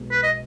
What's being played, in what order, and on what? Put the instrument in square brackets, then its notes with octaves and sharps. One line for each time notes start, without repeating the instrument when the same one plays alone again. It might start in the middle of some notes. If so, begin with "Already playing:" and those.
Already playing: [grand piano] B1 B2 G#3
[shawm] B4
D#5